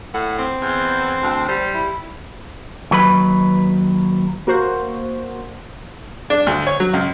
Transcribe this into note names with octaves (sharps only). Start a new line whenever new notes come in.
A2 F#5
C4
E2
D2
G3 C5
E4
D#2 F#3 B4 B5
A#3 F#4 C5
D4
D2
C#5
F#3
C#2